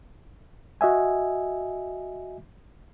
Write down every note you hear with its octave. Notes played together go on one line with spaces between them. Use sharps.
F#4 D#5 E5 G#5